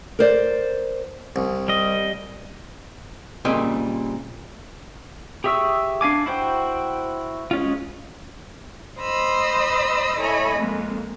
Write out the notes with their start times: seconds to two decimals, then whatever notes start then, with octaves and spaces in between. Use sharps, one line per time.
0.19 A#4 C5 D5
1.36 C2
1.68 G3 D#5
3.45 A#2 C#3 G3 A#3 C4 D#5
5.44 G4 G#4 E5 C#6 E6
6.01 D4 F5 G#5 D6
6.26 E4 F#4 C5 G5
7.51 G#3 C#4 F4
8.99 C5 D#5 B5 C6 D#6 E6
10.18 E4 A4 C#5 D#5 G#5 B5
10.57 F2 G#3 A#3